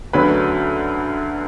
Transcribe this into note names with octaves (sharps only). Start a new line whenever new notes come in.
D2 D3 F#3 C#4 B4 B5